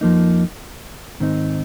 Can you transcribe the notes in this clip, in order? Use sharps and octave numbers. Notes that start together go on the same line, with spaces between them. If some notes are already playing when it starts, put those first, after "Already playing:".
F2 F3 A#3 D#4
G#2 D#3 C4 D#4